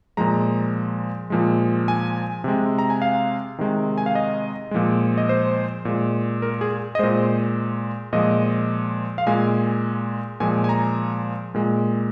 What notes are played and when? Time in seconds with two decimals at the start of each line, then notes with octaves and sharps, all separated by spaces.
0.17 A#2 F3 G#3 A#5
1.30 A#2 F3 G#3
1.88 G#5
2.44 C3 G#3
2.79 A#5
2.90 G#5
3.02 F5
3.58 C3 D#3 G#3
3.98 G#5
4.06 F5
4.15 D#5
4.71 A#2 F3 G#3
5.18 D#5
5.29 C5
5.85 A#2 G#3
6.42 A#4
6.61 G#4
6.95 D#5
6.99 A#2 G#3 C5
8.13 A#2 F3 G#3 D#5
9.18 F5
9.27 A#2 G#3 G#5
10.40 A#2 F3 G#3 G#5
10.64 G#5
10.69 A#5
11.55 A#2 G#3